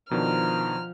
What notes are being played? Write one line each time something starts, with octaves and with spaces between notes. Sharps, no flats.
B2 D#3 F3 D4 C5 A#5 F6